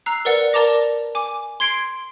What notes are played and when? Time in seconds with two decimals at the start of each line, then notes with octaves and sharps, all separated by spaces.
0.06 A#5 E6 F#6 C7
0.25 A#4 B4 D5 F#5 C#7
0.53 A#4 D5 A5 A#5 D6 A#6
1.15 G#5 D6
1.60 C6 G#6 C7 D7